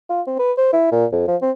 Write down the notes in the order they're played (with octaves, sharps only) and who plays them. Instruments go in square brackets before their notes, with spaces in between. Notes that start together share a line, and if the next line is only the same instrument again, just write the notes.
[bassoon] F4
C4
B4
C5
E4
A#2
F2
F3
C4